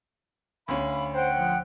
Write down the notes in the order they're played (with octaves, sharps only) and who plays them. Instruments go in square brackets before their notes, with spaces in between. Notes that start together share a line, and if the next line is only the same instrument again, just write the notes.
[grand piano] D2 C#4 [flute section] F5 B5
[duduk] C5 [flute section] F#5 G5 F#6
[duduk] F3